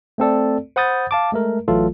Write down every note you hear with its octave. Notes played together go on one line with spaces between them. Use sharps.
A3 C4 A4 D5
C5 F#5 B5 D#6 G6 A6
F5 A5 D6
G#3 A3 A#4
A1 E3 F#3 A3 F4 A4